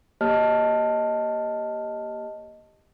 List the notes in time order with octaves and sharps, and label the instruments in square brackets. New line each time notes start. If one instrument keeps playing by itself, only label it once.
[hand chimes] A#3 G4 C#5 D#5 A5 F6